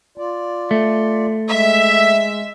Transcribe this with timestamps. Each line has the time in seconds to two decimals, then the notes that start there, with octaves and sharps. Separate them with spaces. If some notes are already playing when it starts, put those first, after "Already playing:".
0.18 F4 D5
0.71 A3
1.49 G#3 E5